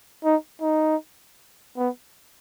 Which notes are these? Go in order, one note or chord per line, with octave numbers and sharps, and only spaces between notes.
D#4
D#4
B3